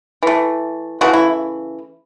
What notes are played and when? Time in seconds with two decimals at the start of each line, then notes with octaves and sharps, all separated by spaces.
0.23 E3 A3
1.01 C#3 E3 A3 F#4
1.13 E4